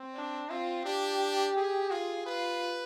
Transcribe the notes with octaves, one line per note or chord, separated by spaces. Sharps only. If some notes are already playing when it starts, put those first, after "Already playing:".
Already playing: C4
D4
C4 F4
D4 G4
G#4
F4 G#4
F4 B4